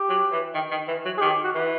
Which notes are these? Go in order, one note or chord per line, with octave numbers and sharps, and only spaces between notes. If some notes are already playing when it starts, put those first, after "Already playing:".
Already playing: G4
F#3
E3
D#3
D#3
E3
F#3
G#4
D#3 G4
F#4
E3